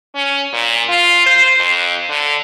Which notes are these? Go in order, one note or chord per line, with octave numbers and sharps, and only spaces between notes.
C#4
A#2
F4
C5
F2
D3